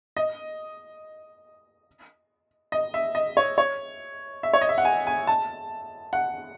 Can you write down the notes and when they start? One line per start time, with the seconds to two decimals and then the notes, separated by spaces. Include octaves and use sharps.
0.17 D#5
2.72 D#5
2.94 E5
3.15 D#5
3.37 C#5
3.58 C#5
4.43 E5
4.53 C#5
4.61 D#5
4.69 E5
4.78 F#5
4.85 G#5
5.07 G#5
5.27 A5
6.13 F#5